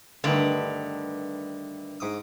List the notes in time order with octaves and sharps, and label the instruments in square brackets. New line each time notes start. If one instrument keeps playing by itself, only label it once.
[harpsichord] G2 D#3 A3 [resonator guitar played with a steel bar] D3
[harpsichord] G#2 D6 D#6